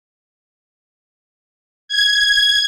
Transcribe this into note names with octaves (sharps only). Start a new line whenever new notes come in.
G#6